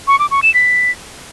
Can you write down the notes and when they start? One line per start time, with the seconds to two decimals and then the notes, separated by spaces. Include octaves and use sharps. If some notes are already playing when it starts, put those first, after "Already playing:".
0.08 C#6
0.19 D6
0.31 C#6
0.43 E7
0.54 B6